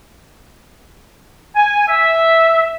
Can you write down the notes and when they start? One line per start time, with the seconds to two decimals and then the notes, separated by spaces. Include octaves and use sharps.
1.55 G#5
1.88 E5